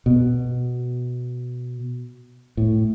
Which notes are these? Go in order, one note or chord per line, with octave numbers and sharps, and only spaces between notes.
B2
A2